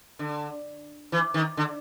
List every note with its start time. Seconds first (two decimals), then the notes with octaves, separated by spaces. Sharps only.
0.19 D3
1.12 E3
1.34 D#3
1.57 D3